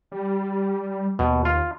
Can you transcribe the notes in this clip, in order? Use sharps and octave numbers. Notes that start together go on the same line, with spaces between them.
G3
D#2 B2
F4